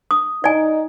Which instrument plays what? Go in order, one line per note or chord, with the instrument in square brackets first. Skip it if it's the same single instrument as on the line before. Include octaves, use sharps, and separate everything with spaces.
[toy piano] D#6
[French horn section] D#4 [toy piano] D5 G#5